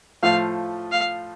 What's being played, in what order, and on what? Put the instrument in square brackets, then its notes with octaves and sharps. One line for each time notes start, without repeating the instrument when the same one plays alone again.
[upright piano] A2 F3 A3 F4 [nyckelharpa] F5
[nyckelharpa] F5